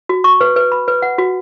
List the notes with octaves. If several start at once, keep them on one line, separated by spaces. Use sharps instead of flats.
F#4
C#6
B4
B4
B5
B4
F#5
F#4